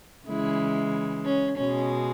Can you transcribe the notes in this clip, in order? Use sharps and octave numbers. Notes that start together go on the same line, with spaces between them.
C#3 E3 G#3 E4
C#4
B2 G#3 C#4